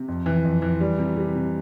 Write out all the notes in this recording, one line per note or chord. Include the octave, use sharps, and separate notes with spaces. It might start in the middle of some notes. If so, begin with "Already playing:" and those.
Already playing: C3
F2
E3
F2
E3
G3
C3
C3
C3